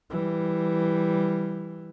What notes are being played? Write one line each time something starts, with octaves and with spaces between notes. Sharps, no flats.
E3 G3